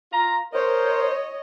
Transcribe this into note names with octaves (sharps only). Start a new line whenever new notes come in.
F4 A#5
A#4 C5 C#5 D#5